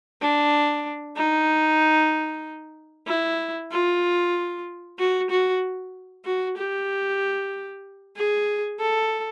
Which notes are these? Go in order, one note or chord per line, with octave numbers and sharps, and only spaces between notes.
D4
D#4
E4
F4
F#4
F#4
F#4
G4
G#4
A4